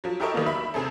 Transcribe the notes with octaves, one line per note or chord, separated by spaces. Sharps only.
F3 F#3
E4 G4 A4 A#4 D#5 C#6
D#3 F#3 G3 A#3 B3
E5 B5
C3 C4 G#4 A4